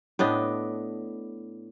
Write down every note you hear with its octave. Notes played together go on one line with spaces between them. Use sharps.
A2 B3 D4 D#5